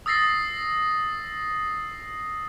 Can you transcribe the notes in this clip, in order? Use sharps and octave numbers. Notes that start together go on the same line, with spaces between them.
D#6 E6 A6 A#6 C7